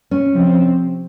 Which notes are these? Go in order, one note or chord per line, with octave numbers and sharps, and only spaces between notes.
C#4
C3 F3 C4